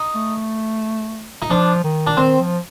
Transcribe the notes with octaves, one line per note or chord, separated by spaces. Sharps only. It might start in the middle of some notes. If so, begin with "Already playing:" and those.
Already playing: D#4
A3
D#4
F3 D4
D#3
D4
D#3 C4
F3